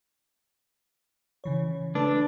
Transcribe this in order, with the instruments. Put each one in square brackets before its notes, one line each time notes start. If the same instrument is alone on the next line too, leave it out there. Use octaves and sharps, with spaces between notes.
[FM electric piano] C#3 E3 C#5
[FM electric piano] A3 B4 [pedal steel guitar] D4